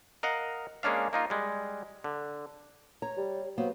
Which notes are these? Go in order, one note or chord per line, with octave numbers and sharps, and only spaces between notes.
A#4 D#5 F5 F#5
G#3 A#3 C#4 D4 F5
A#3 D#4 F4
G3 G#3
D3
C#5 A#5
G3
F#3 A#3 B3 C5